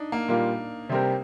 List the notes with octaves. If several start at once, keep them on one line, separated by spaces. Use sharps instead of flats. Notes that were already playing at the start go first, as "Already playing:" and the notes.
Already playing: D4 D#4
A#3
A#2 G3 A#3 F4
C3 G3 C4 G4 A#4